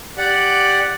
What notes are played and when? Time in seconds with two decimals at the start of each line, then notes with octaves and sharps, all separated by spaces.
0.18 G4 D5 F#5